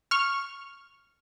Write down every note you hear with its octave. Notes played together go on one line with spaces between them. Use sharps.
C#6 F6